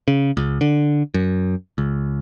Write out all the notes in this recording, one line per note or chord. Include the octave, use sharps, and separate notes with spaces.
C#3
C#2
D3
F#2
C#2